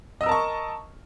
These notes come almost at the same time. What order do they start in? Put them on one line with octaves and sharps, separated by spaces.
D#5 E6 A#4 A5 C#6